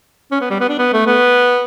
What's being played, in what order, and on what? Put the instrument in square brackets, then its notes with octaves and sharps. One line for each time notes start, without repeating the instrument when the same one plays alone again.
[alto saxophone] C#4
B3
G3
B3
D4
B3
A3
B3